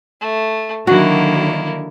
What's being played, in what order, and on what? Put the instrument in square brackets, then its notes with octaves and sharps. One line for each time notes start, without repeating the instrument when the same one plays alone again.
[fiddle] A3
[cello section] D3 D#3 F#3 [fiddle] A#3 E4 [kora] F#4